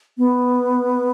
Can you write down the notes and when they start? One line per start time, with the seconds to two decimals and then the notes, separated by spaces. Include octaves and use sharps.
0.18 B3